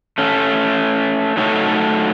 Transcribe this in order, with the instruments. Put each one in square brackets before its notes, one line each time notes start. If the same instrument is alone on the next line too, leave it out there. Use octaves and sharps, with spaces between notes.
[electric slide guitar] A3 C#4 A4
F#3 A3 D#4 A4 C#5